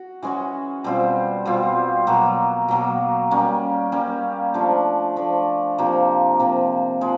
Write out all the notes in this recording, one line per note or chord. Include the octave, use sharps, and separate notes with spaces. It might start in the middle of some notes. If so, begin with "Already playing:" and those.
Already playing: F#4
E3 G#3 C#4 F#4
B2 G3 C4 F4
B2 G3 C4 F4
B2 F#3 A#3
B2 F#3 A#3
G3 A#3 C#4
G3 A#3 C#4
F3 A3 D4
F3 A3 D4
C3 F3 A#3
C3 F3 A#3
F3 G#3